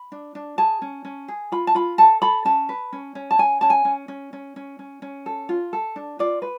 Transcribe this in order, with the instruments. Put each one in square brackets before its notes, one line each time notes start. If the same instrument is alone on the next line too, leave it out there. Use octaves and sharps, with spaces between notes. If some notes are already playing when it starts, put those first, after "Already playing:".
Already playing: [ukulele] B5
D4
D4
G#4 A5
C#4
C#4
G#4
F4 B5
A5
F4 B5
A4 A5
A4 B5
C#4 A5
B4
C#4
C#4
A5
C#4 G#5
C#4 A5
G#5
C#4
C#4
C#4
C#4
C#4
C#4
A4
F4
A4
D4
F4 D5
B4